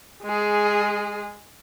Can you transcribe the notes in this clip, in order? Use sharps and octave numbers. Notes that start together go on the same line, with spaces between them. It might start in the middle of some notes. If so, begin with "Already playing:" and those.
G#3 G#4